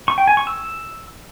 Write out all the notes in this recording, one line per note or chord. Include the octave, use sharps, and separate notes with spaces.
C#6
G5
G#5
C#6
E6